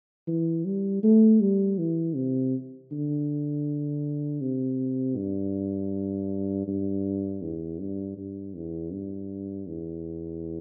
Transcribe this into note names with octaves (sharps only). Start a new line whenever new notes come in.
E3
G3
A3
G3
E3
C3
D3
C3
G2
G2
E2
G2
G2
E2
G2
E2